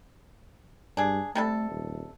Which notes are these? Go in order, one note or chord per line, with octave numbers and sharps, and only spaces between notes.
G2 D4 G#4
C3 G3 A3 A4
D#1